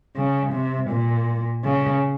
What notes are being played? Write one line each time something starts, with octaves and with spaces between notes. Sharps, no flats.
C#3
C3
A#2
C#3